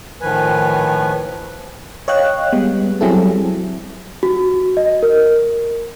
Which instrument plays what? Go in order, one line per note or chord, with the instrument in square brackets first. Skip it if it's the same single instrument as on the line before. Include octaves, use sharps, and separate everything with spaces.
[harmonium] A2 D#3 F3 B4 G#5
[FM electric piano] C#5 D#5 F5 G5 F#6
G3 G#3 B3
F#3 G3 C4 E4 G#4 A4
[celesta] F#4
D#5
A#4